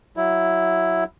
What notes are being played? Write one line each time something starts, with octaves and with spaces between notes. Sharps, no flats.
F#3 E4